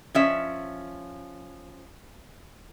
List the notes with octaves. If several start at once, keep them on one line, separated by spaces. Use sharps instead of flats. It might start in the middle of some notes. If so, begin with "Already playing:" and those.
F3 C#4 E5